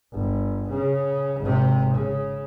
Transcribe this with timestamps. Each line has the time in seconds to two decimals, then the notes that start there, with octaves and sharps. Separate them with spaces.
0.13 G1
0.70 C#3
1.40 G#1 C3
1.94 C#3